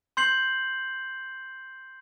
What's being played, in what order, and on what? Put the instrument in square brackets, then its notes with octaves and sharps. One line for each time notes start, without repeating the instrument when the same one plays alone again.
[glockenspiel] C6 G6 C7 F#7